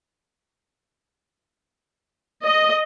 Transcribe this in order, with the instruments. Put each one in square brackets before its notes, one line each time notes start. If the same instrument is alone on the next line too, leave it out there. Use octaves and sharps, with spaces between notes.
[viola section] D#5